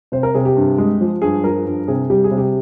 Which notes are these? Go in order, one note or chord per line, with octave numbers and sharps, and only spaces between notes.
C3 C5
A#4
C3 G#4
G4
G2
G#3
F3
G2 G#4
F3 A#4
G2
C3 G#4
G3 G4
G#4
C3
G4